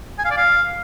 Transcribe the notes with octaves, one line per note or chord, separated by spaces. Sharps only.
G#5
F5
D5
F5